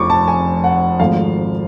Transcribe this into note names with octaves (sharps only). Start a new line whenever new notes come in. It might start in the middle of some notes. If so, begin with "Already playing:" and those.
Already playing: F1 F2 F3 C#6 D6
A5
G#5
F#5
G#1 G#2 F3 A3 F5